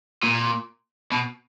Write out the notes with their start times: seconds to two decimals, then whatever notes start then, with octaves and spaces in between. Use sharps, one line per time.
0.23 A#2
1.12 B2